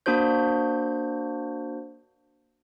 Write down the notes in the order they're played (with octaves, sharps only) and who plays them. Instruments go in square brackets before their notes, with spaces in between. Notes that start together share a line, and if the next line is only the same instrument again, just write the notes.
[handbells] A#3 D4 F#4 C5 G6